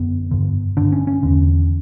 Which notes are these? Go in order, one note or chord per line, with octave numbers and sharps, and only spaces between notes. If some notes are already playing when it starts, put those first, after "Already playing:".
Already playing: F#2 D3 B3
G2 D3
G2 D3 D4
C#4
C#4
E2 D3